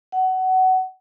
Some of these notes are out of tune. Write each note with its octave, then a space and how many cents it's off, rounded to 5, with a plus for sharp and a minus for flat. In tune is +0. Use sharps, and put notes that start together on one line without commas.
F#5 +20